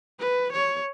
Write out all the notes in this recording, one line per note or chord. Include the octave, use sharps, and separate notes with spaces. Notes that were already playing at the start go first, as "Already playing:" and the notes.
B4
C#5